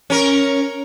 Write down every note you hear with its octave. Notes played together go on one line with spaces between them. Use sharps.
C#4 A#4